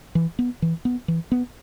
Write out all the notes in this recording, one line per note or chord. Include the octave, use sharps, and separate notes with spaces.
E3
B3
E3
B3
E3
B3